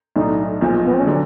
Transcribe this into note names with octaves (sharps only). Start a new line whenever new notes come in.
B1 A2 F#3 A3 D4 D#4
B1 A#2 F3 G#3
B3
C4
C#4
D3 F#3 D4